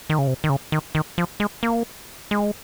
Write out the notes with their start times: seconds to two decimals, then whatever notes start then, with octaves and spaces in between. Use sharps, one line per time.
0.10 D#3
0.18 C#3
0.27 C3
0.44 D#3
0.50 C#3
0.72 D#3
0.95 D#3
1.18 F3
1.40 G#3
1.63 A#3
2.31 G#3